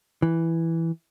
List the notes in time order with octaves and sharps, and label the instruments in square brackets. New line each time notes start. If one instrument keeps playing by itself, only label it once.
[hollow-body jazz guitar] E3